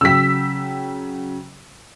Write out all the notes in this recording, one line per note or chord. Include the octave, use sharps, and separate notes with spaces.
C#3 F#3 G5 E6 B6